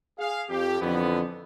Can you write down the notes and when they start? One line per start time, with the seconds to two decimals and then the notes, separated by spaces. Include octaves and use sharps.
0.18 G#4 F5
0.49 F2 G4
0.81 F2 D3 E3 B3